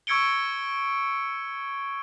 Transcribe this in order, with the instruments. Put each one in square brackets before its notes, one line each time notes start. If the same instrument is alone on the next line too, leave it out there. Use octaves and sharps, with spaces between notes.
[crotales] C#6 E6 G#6 C#7 D7 G7